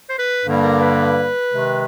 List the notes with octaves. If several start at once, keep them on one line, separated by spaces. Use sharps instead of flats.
C5
B4
G2 D3 G3 A#3
A#4
B4
C3 D#3 G#3